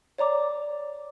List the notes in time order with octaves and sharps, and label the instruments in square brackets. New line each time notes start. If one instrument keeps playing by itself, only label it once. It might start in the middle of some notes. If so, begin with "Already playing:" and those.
[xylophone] C#5 D5 A#5 D6